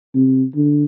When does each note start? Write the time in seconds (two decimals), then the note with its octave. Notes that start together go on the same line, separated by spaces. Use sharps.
0.15 C3
0.55 D3